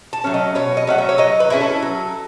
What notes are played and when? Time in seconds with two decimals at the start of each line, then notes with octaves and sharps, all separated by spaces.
0.13 A5
0.24 F#3 A3 C#4
0.34 D#5
0.55 B2 C#5
0.77 D#5
0.87 F#3 A3 C#4 F#5
0.98 E5
1.09 C#5
1.18 F#3 D#5
1.40 B4
1.50 C#4 E4 G#4
1.61 A4
1.82 F#3